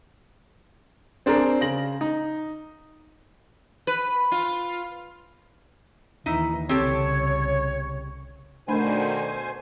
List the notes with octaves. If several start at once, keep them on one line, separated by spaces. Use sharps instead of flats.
C4 D4 G#4 A#4 C5
C#3 A#6 F#7
D#4
B4
F4
D#2 E3 D#4 E4
C2 C#3 C4 G4 A4 C#5
B2 D3 D#3 A3 D4 C5 G#5 B5